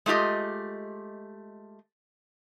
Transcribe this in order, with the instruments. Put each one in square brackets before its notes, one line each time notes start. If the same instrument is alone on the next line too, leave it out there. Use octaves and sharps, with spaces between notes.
[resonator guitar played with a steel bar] G#3 A3 F4 G4 D#5